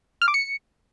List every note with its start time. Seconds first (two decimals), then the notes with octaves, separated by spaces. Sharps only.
0.22 F6
0.28 D6
0.34 C#7